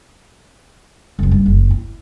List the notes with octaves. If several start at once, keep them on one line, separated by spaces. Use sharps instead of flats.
F#1 F3
G2
F#1
E4